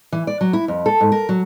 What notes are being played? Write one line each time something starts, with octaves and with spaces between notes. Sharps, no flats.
E3
D5
F#3
E4
F2
A4
G#2
A#4
F#3